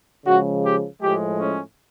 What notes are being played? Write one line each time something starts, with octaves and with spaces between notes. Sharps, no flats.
C#3 F3 G#3 F#4
G4
A2 F3 G#3 G4
C#4